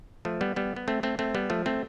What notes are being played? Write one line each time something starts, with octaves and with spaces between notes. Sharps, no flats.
F3 A3
G3 B3
G3 B3
B3
A3 C4
A3 C4
A3 C4
G3 B3
F3 A3
A3 C4